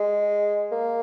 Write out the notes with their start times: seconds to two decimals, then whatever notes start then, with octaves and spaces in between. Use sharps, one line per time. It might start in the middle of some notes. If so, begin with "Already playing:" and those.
Already playing: G#3
0.72 A#3